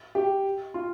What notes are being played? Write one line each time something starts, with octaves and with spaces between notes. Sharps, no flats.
G4
F4